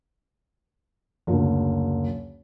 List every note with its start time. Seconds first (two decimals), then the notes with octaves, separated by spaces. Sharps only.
1.27 F#1 D2